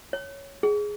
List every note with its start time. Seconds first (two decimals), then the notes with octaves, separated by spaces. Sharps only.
0.13 C#5
0.63 G#4